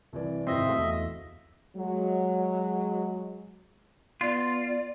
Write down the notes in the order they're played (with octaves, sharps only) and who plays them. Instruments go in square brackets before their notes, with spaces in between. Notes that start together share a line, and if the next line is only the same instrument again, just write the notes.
[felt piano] C2 E3 D5
[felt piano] G#1 E4 A#6 [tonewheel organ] C3 C4 [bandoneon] D#5 E5
[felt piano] A3 F#4 F5
[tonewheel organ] E2
[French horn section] F#3 G#3
[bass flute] B3 [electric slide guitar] F4 [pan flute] D5